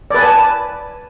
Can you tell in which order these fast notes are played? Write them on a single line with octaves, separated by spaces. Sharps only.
D5 B4 G#5 A5